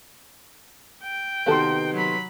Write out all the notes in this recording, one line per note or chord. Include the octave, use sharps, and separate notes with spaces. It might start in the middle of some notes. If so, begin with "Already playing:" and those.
G5
C3 D#3 B3 F#4 A4 C6
F#3 B5